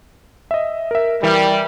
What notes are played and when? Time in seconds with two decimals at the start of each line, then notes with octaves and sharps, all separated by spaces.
0.51 D#5 E5
0.91 A#4 E5
1.23 E3 G3 A#4 E5